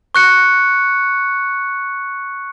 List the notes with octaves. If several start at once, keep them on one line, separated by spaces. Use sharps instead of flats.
C#6 F#6 C#7